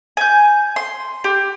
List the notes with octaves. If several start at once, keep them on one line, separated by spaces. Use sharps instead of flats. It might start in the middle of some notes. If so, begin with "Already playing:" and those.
G#5 G6
C6
G4